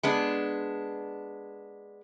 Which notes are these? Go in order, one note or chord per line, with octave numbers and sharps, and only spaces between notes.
G#3 B3 D4